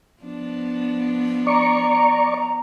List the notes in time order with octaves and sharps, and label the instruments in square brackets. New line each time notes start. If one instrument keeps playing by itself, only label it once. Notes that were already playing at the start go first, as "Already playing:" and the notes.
[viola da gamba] F3 B3 D4
[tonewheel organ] D5 C#6 [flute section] A#5